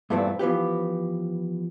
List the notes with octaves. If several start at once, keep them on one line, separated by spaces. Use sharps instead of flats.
G2 A#2 E3 A3 B3 C4
E3 F3 B3 G4